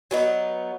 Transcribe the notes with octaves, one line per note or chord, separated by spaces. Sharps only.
F#3 B3 D#4